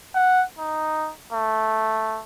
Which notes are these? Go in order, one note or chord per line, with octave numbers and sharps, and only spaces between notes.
F#5
D#4
A3